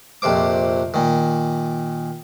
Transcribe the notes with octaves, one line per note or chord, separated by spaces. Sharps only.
A#1 F2 C3 C5 D6
A#2 D#3